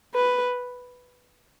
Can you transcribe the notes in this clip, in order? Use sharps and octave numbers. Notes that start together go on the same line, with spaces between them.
B4